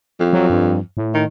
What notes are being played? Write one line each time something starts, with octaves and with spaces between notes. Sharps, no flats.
F2
F#3
G2
A2
D#3